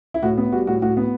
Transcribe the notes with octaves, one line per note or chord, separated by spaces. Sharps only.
E4
A2 F#4
B3
G3 F#4
A2 F#4
A2 F#4
B3